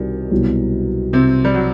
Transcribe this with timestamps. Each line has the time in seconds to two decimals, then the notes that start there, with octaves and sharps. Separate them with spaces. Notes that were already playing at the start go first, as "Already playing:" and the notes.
Already playing: C2 B2 D#3 G3
0.31 C2 B2 F#3
1.13 C3 C4
1.45 G3
1.54 F#3